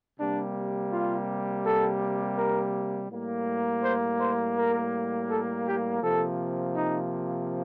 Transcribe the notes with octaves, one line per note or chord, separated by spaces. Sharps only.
C3 G3 A#3 D4
F4
A4
A#4
A2 G3 A#3
C5
C5
A#4
A4
G4
C3 F3 A#3 A4
D#4